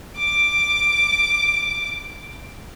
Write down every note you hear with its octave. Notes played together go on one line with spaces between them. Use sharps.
D6 D7